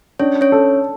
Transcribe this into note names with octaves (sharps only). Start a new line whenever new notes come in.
C#4 D4 C#5
C#4 C#5
A4